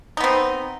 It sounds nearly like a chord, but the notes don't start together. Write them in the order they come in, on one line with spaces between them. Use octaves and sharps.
D#4 B3 C4